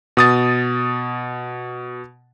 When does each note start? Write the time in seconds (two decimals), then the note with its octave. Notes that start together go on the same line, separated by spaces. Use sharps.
0.17 B2 D#6 A6